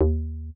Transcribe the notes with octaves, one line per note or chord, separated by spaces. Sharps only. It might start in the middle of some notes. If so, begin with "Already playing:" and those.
D#2